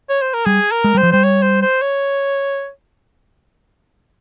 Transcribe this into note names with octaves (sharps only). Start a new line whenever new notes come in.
C#5
C5
A#4
G3 G#4
A#4
G#3
G3 C5
F3
G3 C5
C#5
C5
C5
C#5